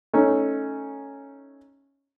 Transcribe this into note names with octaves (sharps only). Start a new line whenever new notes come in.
A3 C#4 D#4